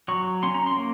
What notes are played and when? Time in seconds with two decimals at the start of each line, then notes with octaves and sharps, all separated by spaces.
0.08 F#3 C#6
0.43 C#4 C6
0.54 A#5
0.66 C6
0.77 A#3